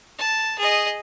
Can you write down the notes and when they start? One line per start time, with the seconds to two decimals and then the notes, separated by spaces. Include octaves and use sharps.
0.19 A5
0.59 G#4 D#5